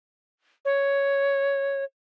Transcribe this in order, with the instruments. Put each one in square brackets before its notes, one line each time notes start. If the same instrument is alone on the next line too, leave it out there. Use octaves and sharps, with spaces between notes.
[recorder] C#5